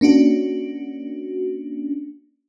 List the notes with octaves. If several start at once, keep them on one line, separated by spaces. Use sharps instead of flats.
A#3 C#4 D4 F#4